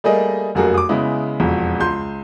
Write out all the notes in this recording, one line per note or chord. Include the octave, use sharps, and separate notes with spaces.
G3 A3 A#3 G#4 D#5
F1 F#2 A#3 F#4 G#4 A4
D6 D#6
C#3 G#3 B3 E4
E1 F2
C#2 C6 G6